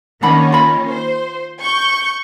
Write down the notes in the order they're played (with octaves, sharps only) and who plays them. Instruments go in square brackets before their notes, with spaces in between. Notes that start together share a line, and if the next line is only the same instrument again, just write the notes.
[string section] D#3 A#3 C#4 [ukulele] D4 F#5 B5
[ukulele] F4 B5
[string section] C5
C#6 G6